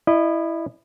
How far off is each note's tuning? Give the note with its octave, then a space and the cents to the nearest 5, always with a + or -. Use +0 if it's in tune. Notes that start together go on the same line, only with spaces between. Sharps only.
E4 +0 D#5 -30